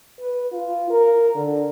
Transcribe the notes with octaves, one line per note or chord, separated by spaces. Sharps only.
B4
F4
A#4
D3